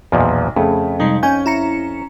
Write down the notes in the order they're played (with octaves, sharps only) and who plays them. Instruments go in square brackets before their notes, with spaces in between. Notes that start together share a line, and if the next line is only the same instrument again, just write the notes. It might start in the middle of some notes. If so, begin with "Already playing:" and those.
[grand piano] B1 [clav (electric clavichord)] E2 A#2 F3
[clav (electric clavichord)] F2 [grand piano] C#3 A3
[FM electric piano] C3 G3 G#3 [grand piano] D#4
[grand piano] C#4 [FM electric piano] D#4 G#5 G6
[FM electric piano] E4 A#5 C#7